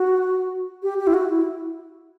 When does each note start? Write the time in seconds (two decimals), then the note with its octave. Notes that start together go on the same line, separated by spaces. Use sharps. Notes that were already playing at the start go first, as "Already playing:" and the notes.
Already playing: F#4
0.83 G4
0.99 G4
1.07 E4
1.14 F#4
1.30 E4